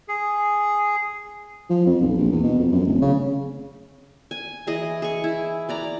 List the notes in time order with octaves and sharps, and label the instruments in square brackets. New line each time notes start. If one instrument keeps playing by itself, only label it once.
[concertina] G#4
[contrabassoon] F3
F2
B1
A#1
E2
B2
F2
F#2
D1
C#3
[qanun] G#5
E3 G#4 D#5
G#4 C#6
E4
B4 D5 A#5